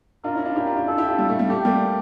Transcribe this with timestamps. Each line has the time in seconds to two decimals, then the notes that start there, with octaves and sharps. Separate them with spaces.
0.24 D4 F4 A#4
0.35 C#4 E4
0.45 D4 F4
0.55 E4 G4
0.66 D4 F4
0.77 E4 G4
0.87 D4 F4 A4
0.97 E4 G4
1.08 D4 F4
1.19 G3
1.29 A3
1.39 G3
1.50 A3 G4
1.65 G3 A#3